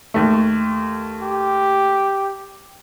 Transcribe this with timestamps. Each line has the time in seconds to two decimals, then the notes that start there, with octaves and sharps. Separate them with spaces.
0.14 D#2 A3
1.22 G4